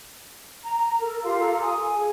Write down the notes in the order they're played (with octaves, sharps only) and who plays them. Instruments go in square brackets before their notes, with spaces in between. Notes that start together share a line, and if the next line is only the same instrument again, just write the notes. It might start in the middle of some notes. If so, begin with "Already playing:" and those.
[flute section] A#5
A4 A#4
F4 G4 F5 C6
A4 A#5
G#5 D#6
G#4